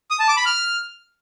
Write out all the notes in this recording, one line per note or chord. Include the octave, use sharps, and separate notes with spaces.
D#6
A5
D6
B5
F6